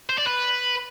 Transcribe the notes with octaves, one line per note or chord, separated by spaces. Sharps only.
C5
D5
B4